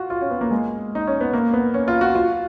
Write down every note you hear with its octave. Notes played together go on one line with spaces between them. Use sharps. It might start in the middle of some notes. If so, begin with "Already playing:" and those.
Already playing: F4 F#4
F4
C#4
B3
A#3
G#3
D#4
C#4
B3
A#3
B3
C#4
F4
F#4
F4